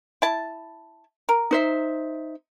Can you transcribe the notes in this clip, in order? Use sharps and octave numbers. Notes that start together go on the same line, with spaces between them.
E4 A5
A#4
D#4 C5 E5